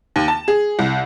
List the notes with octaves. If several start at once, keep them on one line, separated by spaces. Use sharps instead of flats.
D#2
A5
G#4
C2